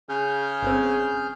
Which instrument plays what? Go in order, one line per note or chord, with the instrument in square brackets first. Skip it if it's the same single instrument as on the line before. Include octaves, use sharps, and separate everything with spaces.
[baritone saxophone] C#3 [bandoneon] G#4 F6 G6
[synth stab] G1 C4